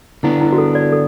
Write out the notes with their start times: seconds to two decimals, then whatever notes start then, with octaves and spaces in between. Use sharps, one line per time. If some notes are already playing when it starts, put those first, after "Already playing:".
0.23 D3 B3 D4 E4
0.41 E4
0.52 F#4
0.58 A4
0.75 D5
0.92 A4